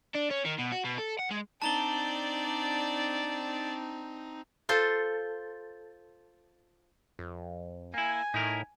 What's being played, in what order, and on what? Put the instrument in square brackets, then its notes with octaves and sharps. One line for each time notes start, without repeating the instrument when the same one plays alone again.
[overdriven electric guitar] D4
C#4
D#3
B2
F#4
B2
A4
F#5
G#3
[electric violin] C4 D#4 [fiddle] D4 D5 [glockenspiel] A5 A#5 G7
[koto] F4 A4 C5
[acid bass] F2
[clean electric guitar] A#3 E4 [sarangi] G#5
[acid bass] A2 [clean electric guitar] D#4 E4 A#4